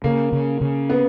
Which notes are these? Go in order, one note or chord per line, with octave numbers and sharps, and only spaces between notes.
C#3 A#3
C#3
C#3
B3